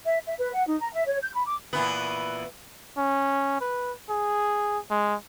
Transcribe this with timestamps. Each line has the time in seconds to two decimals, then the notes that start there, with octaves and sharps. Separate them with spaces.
0.06 E5
0.26 E5
0.39 B4
0.54 F#5
0.68 D#4
0.81 A#5
0.94 E5
1.06 C#5
1.23 G6
1.35 B5
1.47 D6
1.73 A#2 E3 B3
2.97 C#4
3.61 B4
4.10 G#4
4.90 G#3